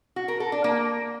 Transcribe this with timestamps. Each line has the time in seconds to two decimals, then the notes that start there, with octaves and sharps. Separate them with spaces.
0.16 F#4
0.28 A#4
0.40 A4
0.52 D4
0.64 A#3